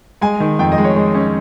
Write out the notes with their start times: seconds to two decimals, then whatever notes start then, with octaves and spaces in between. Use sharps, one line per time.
0.21 G#3 G#5
0.40 D#3
0.59 F2 G5
0.72 D#5
0.78 G#3
0.84 C#5
0.96 G#3
1.14 C#4